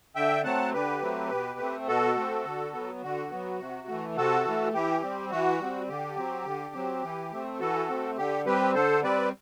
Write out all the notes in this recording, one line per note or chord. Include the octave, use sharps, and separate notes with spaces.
D3 E5 G5
F#3 A3 C4 F#5 A5
D3 G4 B4
F#3 A3 C4
B2
A3 C4
B2 F#4 A4
A3 C4
D3
F#3 B3
D3 F#4
F#3 B3
C3
E3 A3
C3 F#4 A4
E3 A3
E3 G4
G3 C4
E3 F#4
G3 C4
D3 G4
F#3 C4
D3
F#3 C4
E3
A3 C4
E3 F#4 A4
A3 C4
D3 G4
G3 C4 G4 B4
D3 A4 C5
G3 C4 B4 D5